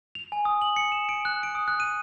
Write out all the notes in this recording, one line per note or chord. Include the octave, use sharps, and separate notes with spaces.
F7
G#5
D#6
F#7
C#7
E7
D7
F#6
D7
D#6
F#6
D#7